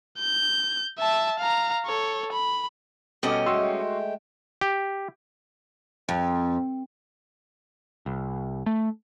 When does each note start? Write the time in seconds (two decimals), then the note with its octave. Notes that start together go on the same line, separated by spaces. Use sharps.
0.19 G6
0.99 E5 A5
1.40 F5 A#5
1.85 A4 C#5
2.33 B5
3.23 B2 G3 C#4 A4 D#5 D6
3.46 G#3 A3 F#4 G5 C6 E6
4.61 G4
6.09 F2
8.06 C2
8.66 A3